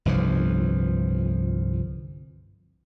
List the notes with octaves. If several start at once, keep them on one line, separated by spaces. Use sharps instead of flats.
G1 C2 E3 F3